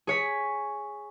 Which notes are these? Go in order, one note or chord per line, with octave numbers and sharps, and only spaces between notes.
G#4 C#5 B6